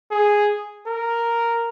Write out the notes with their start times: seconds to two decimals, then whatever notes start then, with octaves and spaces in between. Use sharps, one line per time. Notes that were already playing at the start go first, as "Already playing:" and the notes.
0.11 G#4
0.87 A#4